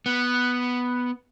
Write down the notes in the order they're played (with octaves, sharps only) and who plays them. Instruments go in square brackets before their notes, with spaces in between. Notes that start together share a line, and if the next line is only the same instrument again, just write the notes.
[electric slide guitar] B3